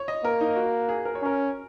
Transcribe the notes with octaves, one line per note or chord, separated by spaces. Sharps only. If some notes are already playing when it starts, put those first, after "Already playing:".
Already playing: C#5
D#5
A#3 A#4
D#4
F#4
G#4
A#4
C#5
C#4 A#4